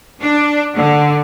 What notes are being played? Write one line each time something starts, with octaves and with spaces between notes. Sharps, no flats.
D4
D3